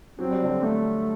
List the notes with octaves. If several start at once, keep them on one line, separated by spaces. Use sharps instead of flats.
F#3 C4
G3
D3 F#3
A3